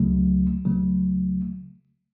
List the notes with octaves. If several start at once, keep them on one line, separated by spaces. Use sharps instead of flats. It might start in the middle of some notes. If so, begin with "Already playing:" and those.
Already playing: C#2 C#3 F#3 A3
C#2 C#3 F#3 A3